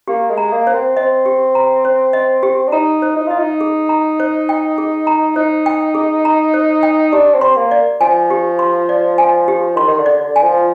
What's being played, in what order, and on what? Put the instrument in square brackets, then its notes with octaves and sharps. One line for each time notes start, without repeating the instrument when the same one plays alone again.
[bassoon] A#3 [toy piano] G4
[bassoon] G#3
[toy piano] A#5
[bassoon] A#3
[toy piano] C5
[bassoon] C4
[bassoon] C4 [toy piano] D#5
[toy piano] G4
A#5
C5
D#5
G4
[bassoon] D4
[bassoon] D#4 [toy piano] A#5
[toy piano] C5
[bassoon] D#4
[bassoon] F4 [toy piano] D#5
[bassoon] D#4
[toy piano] G#4
A#5
C5
G5
G#4
A#5
[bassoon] D#4 [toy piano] C5
[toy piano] G5
G#4
A#5
C5
G5
[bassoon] D4 [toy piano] G4
[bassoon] C4
[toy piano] C6
[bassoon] A#3
[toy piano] D5
[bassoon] F3 [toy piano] G#5
[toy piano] G4
C6
D5
G#5
G4
[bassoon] D#3 [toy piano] C6
[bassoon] D#3
D3
[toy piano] D5
[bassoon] D3
[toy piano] G#5
[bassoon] F3